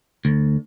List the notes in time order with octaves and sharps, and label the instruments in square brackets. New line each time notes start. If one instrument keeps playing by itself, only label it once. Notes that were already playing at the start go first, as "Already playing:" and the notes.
[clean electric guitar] D2